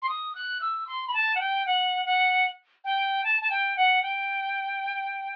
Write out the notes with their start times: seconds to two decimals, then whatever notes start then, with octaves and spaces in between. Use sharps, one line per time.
0.02 C6
0.09 D#6
0.35 F#6
0.61 E6
0.87 C6
1.08 B5
1.14 A5
1.35 F#5
1.40 G5
1.66 F#5
2.06 F#5
2.85 G5
3.24 A5
3.41 A5
3.50 G5
3.76 F#5
4.02 G5